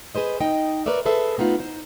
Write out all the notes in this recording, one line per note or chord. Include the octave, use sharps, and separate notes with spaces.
G#4 B4 C5 D#5
D#4 D#5 G5
A#4 B4 C#5 D5 E5
G#4 A4 B4 C5 E5
A3 B3 D#4 F4
D#4 C5